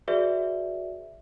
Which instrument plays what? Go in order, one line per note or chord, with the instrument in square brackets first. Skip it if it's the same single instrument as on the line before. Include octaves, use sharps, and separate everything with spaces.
[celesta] F#4 G#4 B4 D5 E5